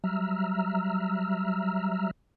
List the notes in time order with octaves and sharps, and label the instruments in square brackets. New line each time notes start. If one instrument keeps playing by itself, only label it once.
[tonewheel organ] F#3 G3 E5 A#5 E6 F6